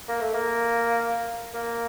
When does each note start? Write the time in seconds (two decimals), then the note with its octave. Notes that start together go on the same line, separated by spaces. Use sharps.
0.09 A#3
0.21 A3
0.34 A#3
1.54 A#3